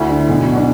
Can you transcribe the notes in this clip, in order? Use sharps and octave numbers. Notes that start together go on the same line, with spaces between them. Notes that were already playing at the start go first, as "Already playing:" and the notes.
Already playing: D2 E4
D3
B1
B2
D4